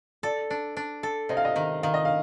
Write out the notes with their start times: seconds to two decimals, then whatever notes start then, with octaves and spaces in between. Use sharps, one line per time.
0.23 A4 D5
0.50 D4
0.77 D4
1.03 A4
1.29 C3 D#5
1.37 F5
1.45 D#5
1.56 D#3
1.83 D#3 F5
1.94 D#5
2.05 F5